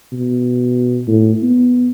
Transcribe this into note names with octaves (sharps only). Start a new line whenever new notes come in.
B2
A2
B3